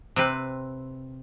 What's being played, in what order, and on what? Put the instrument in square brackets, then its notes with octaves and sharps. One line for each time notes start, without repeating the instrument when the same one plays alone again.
[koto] C3 C4 B4